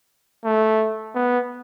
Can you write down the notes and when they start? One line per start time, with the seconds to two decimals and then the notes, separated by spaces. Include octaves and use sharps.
0.44 A3
1.15 B3